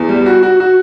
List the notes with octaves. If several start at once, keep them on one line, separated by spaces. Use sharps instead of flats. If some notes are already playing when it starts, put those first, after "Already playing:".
Already playing: E2
G3
F#4
F#4
F#4